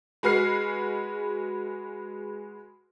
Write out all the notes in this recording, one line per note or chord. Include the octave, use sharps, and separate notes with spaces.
G#3 F#4 B4 F6 C7